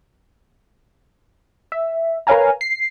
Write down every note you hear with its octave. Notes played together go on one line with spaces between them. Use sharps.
E5
A#4 B4 C#5 F5 G#5 A#5
C7